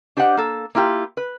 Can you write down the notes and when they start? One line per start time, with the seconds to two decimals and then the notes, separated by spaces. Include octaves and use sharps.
0.17 D4 G4 C5 D#5 F#5
0.37 A#3 A4
0.75 A#3 E4 F4 G4
1.17 B4